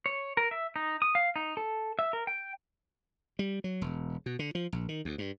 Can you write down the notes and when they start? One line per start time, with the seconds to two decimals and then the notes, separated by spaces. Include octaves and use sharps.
0.06 C#5
0.37 A#4
0.51 E5
0.76 D#4
1.02 D#6
1.15 F5
1.36 D#4
1.57 A4
1.99 E5
2.13 A#4
2.27 G5
3.39 G3
3.64 F#3
3.81 E1
4.26 B2
4.39 D3
4.55 F3
4.72 A#1
4.89 D#3
5.05 D2
5.18 G2